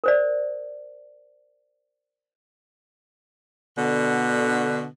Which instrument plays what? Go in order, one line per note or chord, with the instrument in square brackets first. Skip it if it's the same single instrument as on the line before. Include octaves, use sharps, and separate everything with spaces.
[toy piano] A#4 C5 D5
[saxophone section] B2 D3